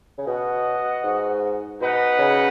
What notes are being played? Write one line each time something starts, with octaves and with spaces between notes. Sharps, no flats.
C#3
B2 F#4 D#5 F#5
G#2
B2 D#4 B4 D#5 F#5
C#3